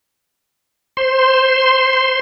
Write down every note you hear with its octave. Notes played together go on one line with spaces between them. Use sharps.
C5 C6